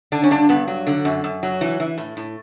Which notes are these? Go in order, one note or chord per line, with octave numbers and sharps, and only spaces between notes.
D3 D4
C#4
G2 D4
G2 B3
F#3
D3
F#2
F#2
F#3
E3
E3
A2
A2